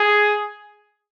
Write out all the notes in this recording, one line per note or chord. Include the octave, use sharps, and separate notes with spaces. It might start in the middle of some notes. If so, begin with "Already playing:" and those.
Already playing: G#4